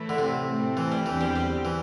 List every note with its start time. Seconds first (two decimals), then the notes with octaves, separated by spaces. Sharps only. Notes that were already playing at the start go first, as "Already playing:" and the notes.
Already playing: A2 E3 A3 E4
0.09 D3
0.18 C3
0.47 A2 A3 C4
0.77 E3
0.92 G3
1.06 E2 D3 E3 C4 G4
1.21 G3
1.36 G3
1.65 E3